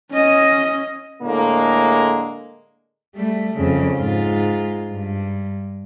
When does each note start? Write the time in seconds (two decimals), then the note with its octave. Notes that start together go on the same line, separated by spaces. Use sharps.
0.11 C#4 D#5
1.22 A2 D3 G#3 A#3
3.15 G3 A3
3.55 F2 C#3
3.96 G#2 F4
4.92 G2